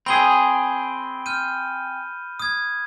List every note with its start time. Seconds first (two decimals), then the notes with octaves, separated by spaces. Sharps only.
0.06 C4 G#4 B5 G7
1.26 F6 G6 D#7
2.39 D#6 G#6